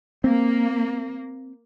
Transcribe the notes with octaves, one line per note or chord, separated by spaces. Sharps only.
A#3 C4